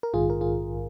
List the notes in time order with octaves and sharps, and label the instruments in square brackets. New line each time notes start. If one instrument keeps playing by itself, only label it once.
[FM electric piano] A#4
A#1 G#2 D#3 F4 G#4
A#4
F4 G#4